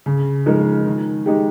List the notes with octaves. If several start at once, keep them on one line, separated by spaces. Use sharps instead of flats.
C#3
F3 G#3 D#4 A#4
D#3
G#3 D#4 G4